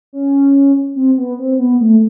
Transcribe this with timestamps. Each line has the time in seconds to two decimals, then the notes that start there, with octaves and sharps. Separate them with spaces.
0.13 C#4
0.96 C4
1.18 B3
1.39 C4
1.59 B3
1.81 A3